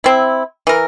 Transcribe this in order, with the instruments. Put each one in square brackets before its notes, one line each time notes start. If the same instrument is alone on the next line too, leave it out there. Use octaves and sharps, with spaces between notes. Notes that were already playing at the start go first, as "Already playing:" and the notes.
[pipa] C4 E4
E3 A#4